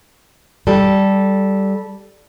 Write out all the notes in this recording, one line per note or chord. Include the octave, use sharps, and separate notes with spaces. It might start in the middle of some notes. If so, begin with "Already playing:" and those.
G3 A4